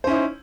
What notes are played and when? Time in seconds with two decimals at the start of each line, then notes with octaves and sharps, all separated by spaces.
0.04 C5
0.07 C#4
0.10 E4
0.13 D#4